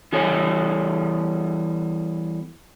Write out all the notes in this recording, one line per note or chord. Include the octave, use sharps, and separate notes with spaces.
E3 G3 B3 A4 C#5 G#5